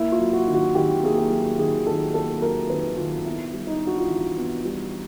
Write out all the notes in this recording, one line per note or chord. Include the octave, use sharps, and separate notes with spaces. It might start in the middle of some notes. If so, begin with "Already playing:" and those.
Already playing: A#3 E4
F4
F#3
F#4
D#3
F#4
D#3 G4
A#3 G#4
G4
F#3
D#3 G#4
D#3 A4
A#3 A4
F#3 A#4
D#3 B4
D#3 F4
B3 E4
G3
D#4
D4
F#4
F4
E3 E4
B3
G3